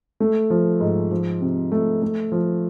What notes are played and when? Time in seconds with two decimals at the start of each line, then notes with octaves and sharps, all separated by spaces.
0.20 A3
0.50 F3
0.80 G#2
1.11 F3
1.41 C3
1.72 A3
2.03 A3
2.32 F3